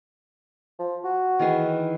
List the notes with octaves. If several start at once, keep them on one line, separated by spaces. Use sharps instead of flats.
F3
F#4
D#3 E3 G#4